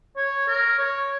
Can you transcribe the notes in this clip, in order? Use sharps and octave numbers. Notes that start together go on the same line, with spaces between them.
C#5
A#4
C#5